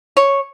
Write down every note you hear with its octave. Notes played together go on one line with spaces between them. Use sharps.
C#5